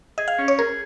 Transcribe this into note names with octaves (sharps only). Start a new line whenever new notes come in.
G#4 D#5
F5
C#4
C#5
G#4 A#4